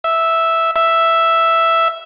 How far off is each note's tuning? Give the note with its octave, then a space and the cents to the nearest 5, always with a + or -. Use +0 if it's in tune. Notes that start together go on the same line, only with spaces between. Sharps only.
E5 -5
E5 +0